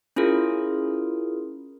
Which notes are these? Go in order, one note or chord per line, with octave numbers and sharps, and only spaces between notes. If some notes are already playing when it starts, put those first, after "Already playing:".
C#4 E4 F4 G#4 A#4